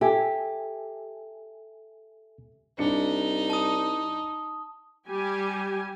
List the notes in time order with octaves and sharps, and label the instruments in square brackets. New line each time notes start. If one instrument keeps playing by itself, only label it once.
[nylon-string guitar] G4 [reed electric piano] A4 E5 G#5
[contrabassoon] C2 [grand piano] D4 C#7 [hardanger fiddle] D#4
[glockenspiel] A5 D#6
[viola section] G3 G4 G#5